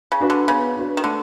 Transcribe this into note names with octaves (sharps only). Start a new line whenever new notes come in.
C#3
D4 F#4 B4
D3
C#3 B3
D4 F#4 B4
D#3
D3 A3